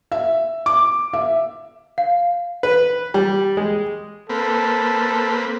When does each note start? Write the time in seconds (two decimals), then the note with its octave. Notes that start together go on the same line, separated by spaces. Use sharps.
0.12 E5
0.66 D6
1.13 E5
1.98 F5
2.63 B4
3.14 G3
3.57 G#3
4.30 A#3 C4 A4 B4